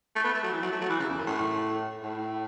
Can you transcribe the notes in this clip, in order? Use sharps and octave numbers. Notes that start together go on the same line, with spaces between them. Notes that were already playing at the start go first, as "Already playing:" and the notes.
A3
B3
A3
F#3
E3
F#3
A3
F#3
E3
C#3
E2
F#2
A2
A2